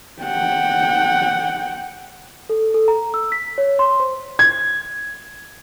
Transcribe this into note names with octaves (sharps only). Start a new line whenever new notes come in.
F#5 G5
A4
A4
A#5
E6
B6
C#5
C6
C5
G#6